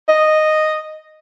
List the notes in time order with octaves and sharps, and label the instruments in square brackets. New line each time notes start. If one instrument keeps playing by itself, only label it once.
[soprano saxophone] D#5